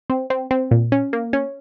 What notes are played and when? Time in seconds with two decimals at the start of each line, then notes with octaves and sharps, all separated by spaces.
0.10 C4
0.30 C4
0.51 C4
0.71 A#2
0.92 C#4
1.13 A#3
1.33 C#4